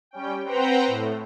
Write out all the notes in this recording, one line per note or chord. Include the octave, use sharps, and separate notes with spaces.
G3 C#4 G5
C4 B4 C5 F#5 G5 A#5
A2